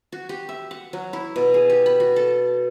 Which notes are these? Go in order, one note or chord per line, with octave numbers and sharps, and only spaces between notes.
F#4
G4
E5
F#5
F#3
E4
B2
G#4
G4
B5
F#4
A4